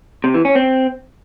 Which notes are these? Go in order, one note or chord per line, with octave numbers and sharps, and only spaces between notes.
C3
E3
C#4
C4